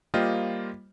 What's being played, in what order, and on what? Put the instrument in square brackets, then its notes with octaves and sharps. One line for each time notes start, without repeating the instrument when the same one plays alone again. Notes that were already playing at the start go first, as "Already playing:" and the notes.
[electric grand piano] G3 A#3 F4 G4 C5 D#5